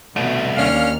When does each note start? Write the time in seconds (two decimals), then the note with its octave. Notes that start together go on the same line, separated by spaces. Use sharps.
0.16 C2 B2 A3
0.57 D#2 C#4 D4 F5 F6